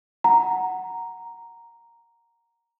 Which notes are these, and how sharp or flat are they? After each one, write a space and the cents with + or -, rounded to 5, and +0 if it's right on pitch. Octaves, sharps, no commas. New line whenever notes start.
F#5 +0 A#5 +0